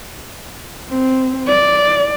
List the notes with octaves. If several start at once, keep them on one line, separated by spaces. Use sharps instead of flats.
C4
D5